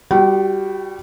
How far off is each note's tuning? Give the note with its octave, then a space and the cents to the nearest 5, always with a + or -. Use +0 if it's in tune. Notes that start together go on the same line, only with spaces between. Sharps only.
G3 +0 F#4 -10 G5 -40